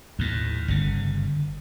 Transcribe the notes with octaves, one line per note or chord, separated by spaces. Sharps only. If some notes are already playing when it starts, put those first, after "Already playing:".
D#2 A2
G1 C#3